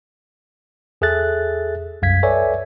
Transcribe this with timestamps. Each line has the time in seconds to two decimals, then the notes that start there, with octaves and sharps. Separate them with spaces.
1.01 E2 G#4 A4 E5 F#6 A6
2.02 C2 F#2 F5 G#6 B6
2.23 A4 B4 C#5 D5 E5 G#5